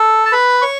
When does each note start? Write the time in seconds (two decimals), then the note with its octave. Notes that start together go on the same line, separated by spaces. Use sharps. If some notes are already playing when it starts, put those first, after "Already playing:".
Already playing: A4
0.25 A5
0.32 B4 B5
0.62 C#5 C#6